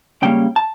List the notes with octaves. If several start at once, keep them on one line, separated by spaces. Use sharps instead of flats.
C#2 C#3 G3 A#3 C#4 G5
A5